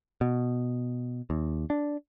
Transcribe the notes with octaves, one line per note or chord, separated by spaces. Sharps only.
B2
D#2
D4